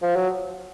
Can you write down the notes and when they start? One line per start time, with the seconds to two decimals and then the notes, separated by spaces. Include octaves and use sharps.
0.03 F3
0.16 F#3